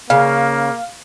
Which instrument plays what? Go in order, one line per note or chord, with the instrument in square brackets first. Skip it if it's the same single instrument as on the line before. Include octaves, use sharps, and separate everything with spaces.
[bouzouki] C#3 [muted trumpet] A#3 [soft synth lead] F5